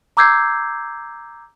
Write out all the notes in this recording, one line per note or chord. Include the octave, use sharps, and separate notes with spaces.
A#5 D6 E6 G6 G#6 C7